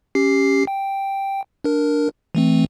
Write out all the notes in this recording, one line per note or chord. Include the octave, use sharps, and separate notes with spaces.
C#4 G4 C7
G5
D4 A#4
E3 A3 C4